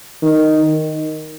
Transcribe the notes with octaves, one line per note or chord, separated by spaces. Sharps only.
D#3